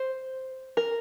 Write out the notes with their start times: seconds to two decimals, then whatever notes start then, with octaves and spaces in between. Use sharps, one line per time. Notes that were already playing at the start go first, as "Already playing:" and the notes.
Already playing: C5
0.77 A#4